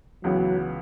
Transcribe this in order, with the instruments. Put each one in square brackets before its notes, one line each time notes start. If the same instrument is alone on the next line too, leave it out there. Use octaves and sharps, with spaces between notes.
[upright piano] C#2 C#3 E3 B3 [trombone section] F#3